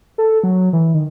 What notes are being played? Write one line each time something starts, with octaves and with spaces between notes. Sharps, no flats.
A4
F#3
E3
D#3